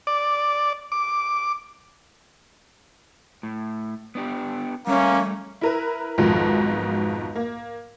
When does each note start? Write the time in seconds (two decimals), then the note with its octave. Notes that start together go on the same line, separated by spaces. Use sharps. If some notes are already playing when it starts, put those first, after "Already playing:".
0.07 D5
0.92 D6
3.43 A2
4.15 B3 D4 G4
4.87 G3 A3 A#3 C#4 E5
5.61 E4 A#4 B4
6.18 B1 F2 G#2 B2 D#3 F3
7.36 A#3